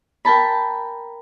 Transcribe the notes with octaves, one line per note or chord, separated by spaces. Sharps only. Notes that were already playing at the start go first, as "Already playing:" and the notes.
A#4 G5 A5 B5